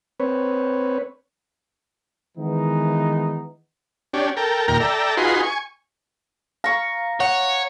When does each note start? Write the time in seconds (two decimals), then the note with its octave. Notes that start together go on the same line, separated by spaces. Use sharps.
0.20 C4 B4 C#5
2.38 D#3 E3 G#3 B3 D#4
4.14 C#4 D4 G4
4.37 A4 A#4 G5
4.68 D#2 A#2 A#4 G5 A#5 F6
4.80 A4 D5 E5 G5 A#5
5.17 D#4 F4 F#4 G#4 B4 C6
5.43 G#5 C#6
6.64 F5 A#5 C#6
7.20 C#5 F#5